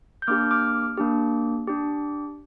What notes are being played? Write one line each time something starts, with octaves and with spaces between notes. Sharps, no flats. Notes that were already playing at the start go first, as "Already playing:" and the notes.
G6
A#3 D4 G4 D6 F6
D6 F6
A#3 D4 G4
D4 G4